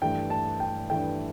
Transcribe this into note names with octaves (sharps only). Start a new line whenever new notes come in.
G2 E3 A3 G5
A5
G5
G2 E3 A3 G5